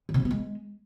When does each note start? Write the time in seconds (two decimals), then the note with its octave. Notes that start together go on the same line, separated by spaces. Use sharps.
0.09 D#3
0.14 C3
0.20 C4
0.25 B3
0.31 G#3